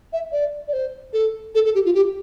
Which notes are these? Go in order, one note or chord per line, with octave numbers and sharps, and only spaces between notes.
E5
D5
D5
C5
A4
A4
A4
G4
F4
G4